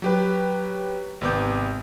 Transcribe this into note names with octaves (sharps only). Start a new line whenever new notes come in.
F#3 G4 B4
G#1 C3 B3 D6 G6